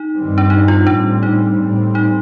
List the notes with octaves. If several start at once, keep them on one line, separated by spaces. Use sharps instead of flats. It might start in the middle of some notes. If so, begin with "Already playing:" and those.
Already playing: D#4
G2 D#3 G3 C4
D4
D#4
F4
A2 G3 C4 D4
D#4
A2 G3 C4
D#4